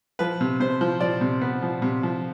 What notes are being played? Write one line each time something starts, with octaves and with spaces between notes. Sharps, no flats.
F3 B4
C3
C3 C5
F3
F3 D5
C3
B3
F3
C3
F3